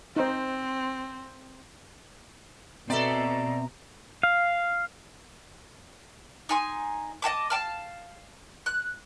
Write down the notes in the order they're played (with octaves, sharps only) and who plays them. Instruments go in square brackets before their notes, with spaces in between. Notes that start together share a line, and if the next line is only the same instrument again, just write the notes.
[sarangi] C4 [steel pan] D#4 C5
[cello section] B2 [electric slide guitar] C4 E5 [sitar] A4 D5 [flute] A#5
[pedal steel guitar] F5
[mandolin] D#4 G#5 C6
D#5 F#5 A5 D6
F5 G5 A5 F6
F#6